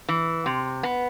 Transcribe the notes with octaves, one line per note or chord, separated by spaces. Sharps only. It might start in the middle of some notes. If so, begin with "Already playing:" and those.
E3
C3
B3